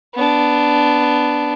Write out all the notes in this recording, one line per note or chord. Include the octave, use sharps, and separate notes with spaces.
B3 D4